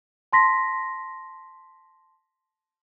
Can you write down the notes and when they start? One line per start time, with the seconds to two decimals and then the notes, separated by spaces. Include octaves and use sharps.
0.33 A5 C6 A#6 B6